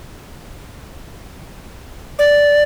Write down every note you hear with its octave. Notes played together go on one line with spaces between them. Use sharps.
D5